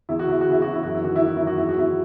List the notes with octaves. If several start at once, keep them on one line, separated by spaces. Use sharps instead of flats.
E2 E4
F#4
E2 E4
F#4
C#3
E4
E3 F#4
E4
F#2 F#4
E4
D#3 F#4
E4
D#3 F#4
F#2 E4
F#4
E2 E4
F#4
E2 E4